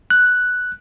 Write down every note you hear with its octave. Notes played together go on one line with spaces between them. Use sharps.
F#6